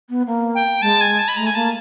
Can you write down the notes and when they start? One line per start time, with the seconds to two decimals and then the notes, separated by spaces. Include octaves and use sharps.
0.09 B3
0.27 A#3
0.55 G5
0.82 G#3 A5
1.01 G#5
1.18 A5
1.28 B5
1.36 A3 A#5
1.46 G#5
1.55 A#3 A5